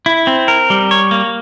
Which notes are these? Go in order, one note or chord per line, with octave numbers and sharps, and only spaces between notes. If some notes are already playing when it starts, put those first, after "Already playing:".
E4
C4
A#4
G3
C#5
A#3